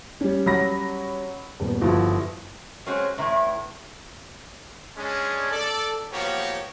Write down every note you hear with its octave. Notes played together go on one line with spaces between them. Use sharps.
G3 C#4
F#3 B5 A#6
D#1 B3
G1 F3 E4 F#4
F#3 G#3 C4 C#4
E2 A2 C3
G#3 C#4 D4
A4 D5
F3 A#3 B3 F#4 G4 C#5